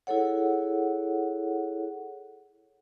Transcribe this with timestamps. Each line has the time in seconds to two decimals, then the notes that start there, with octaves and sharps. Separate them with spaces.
0.07 E4 G#4 A4 C#5 F#5